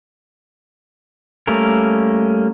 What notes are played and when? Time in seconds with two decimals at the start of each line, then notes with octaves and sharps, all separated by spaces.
1.47 G3 A3 A#3 C#4 A#4